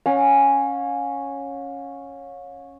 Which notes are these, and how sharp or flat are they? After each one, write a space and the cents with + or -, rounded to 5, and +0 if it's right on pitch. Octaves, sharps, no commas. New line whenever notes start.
C#4 -5 F5 +45